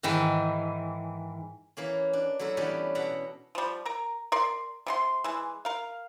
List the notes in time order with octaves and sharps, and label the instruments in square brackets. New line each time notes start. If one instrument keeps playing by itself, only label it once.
[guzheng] G#2 D#3 E3
E3 A#3 C#4
D4
F#3 A3 E4 A4 A#4
E3 G3 B3 C#4 D4
B2 E5 F#5 A5 A#5
[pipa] F3 G3
A#4 A#5
A#4 D5 C6
C3 F4 C6
E3 G#3
A#4 F5